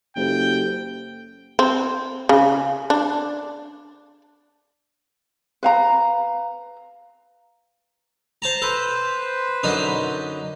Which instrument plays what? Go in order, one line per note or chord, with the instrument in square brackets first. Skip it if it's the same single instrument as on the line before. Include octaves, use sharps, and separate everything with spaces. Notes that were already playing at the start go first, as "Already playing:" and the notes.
[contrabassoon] F#1 [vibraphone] G4 A4 C5 [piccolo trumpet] G5
[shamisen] C4
C#3
D4
[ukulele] B4 F5 A#5
[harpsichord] C5 A5 A#5
[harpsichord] A4 [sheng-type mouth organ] B4 C5
[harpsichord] F#2 D3 D#4